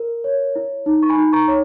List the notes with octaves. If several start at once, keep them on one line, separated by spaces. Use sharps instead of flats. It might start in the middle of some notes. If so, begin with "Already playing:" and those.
Already playing: A#4
C#5
E4
D#4
C#6
G#5 B5
D#4
A#5 C#6
C#5